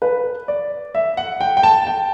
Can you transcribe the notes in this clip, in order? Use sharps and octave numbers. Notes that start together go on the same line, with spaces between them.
B4
D5
E5
F#5
G5
G5
A5
G5